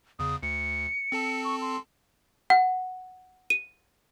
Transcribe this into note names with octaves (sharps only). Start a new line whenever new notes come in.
E2 C#3 D#6
D2 C#7
C4 A4 A5
C#6
C6
F#5
D#7